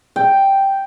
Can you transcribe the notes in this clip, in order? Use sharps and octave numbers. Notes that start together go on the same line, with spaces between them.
G5